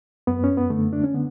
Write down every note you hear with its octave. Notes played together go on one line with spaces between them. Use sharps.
F#2 B3
C#4
B3
D3 A3
D4
C#4
D3 B3